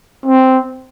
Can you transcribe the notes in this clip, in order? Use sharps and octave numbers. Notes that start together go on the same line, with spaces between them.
C4